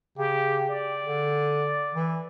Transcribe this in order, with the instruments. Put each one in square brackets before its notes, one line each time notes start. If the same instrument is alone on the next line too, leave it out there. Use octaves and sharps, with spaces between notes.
[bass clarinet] C#3 [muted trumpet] G4
[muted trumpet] D5
[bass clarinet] D3
E3